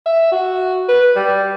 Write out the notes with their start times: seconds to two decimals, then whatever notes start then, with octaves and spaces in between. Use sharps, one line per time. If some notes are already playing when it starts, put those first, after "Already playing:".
0.06 E5
0.32 F#4
0.89 B4
1.16 G3